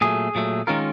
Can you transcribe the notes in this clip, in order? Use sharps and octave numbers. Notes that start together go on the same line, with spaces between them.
A#2 F#3 A3 G#4
A#2 F#3 A3
D#3 G#3 C#4 F4 A#4